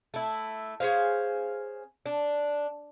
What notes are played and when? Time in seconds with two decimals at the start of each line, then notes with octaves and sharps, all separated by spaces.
0.14 A3 E4
0.80 C#4 G#4 C5 F5
2.06 D4